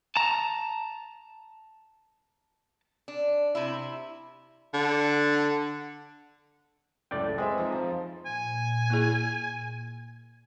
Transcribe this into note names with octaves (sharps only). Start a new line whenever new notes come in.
A5 A#5
D4
C3 E4
D3
C#2 F#2 A2 D5 G5
G#3 C4 G#4 B4 E5 G5
F2 F3 D#4 A#5
F5 A5
A#2 G#5
A#3 E4 G#4